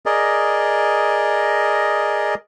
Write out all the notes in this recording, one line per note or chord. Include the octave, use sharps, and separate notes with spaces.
G#4 A#4 D5 D#5